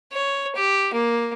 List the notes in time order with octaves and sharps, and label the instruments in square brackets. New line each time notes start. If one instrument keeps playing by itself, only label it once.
[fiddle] C#5
G4
A#3